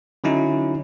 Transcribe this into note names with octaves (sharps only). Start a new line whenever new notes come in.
D3 F#3 C#4 D#4 E4